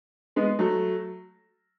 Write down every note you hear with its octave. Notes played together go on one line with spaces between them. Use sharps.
G#3 B3
F#3 A3